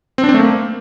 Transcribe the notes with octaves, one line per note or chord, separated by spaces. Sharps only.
C4
D4
C4
A3
A#3